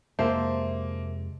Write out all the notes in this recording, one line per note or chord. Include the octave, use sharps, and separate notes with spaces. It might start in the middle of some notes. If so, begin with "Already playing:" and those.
F2 C3 G#3 A#3 C5 E5 A5